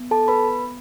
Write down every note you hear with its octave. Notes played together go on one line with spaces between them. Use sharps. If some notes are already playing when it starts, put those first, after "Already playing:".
Already playing: B3
A4 A5
B4 B5